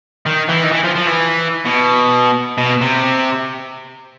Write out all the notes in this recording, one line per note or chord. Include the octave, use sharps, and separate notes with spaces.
D#3
E3
D#3
E3
F3
F3
E3
B2
B2
C3